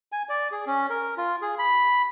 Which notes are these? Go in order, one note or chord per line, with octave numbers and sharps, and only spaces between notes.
G#5
D5
G#4
C#4
A#4
F4
G#4
B5